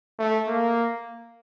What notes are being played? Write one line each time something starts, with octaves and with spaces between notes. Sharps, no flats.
A3
A#3